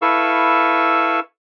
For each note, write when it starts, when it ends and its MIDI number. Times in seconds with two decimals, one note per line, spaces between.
0.02 1.20 64
0.02 1.20 69
0.02 1.20 71
0.02 1.20 77
0.02 1.20 85
0.02 1.20 88